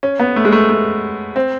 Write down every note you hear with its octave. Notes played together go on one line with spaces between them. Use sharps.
C#4
B3
A3
G#3
A3
A3
C4